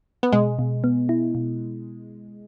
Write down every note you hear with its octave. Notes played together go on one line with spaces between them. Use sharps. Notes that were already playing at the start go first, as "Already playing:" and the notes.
B3
B2 G#3
B2
B3
E4
B2